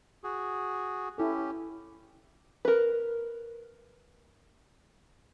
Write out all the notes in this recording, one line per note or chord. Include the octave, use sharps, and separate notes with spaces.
F#4 G#4
C#4 E4 G4 A4
A#4 B4